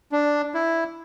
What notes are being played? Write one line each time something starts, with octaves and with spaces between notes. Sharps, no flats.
D4
E4